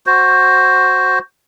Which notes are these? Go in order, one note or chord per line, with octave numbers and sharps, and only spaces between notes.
F#4 C5